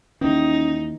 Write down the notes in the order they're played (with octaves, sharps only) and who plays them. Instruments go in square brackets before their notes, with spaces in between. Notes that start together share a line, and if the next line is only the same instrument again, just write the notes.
[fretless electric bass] D#2 E3 [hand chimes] C#4 [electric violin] D#4